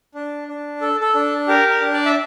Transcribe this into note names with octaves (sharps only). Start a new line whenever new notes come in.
D4
D4
A4
A4
D4
G4 A#4
A#4
D4
D5
E5